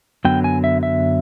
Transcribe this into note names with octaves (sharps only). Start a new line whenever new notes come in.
F#2 D3 F#3 B3 G5
G#5
E5
E5